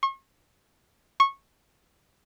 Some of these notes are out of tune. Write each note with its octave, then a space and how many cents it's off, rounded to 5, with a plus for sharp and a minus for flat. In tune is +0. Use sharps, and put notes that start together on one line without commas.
C#6 -40
C#6 -15